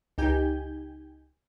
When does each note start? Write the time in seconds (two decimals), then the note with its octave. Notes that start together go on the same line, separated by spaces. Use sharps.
0.18 C#2 D#4 G4 G#5 G6